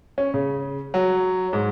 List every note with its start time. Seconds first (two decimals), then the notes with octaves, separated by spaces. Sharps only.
0.18 C#4
0.34 C#3
0.94 F#3
1.53 G#2